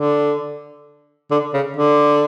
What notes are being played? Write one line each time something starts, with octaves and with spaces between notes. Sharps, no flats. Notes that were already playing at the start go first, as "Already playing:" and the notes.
Already playing: D3
D3
C#3
D3